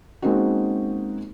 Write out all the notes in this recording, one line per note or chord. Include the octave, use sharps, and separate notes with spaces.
G#3 A#3 C4 C#4 D#4 F#4